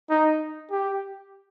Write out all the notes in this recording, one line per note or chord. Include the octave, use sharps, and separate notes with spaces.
D#4
G4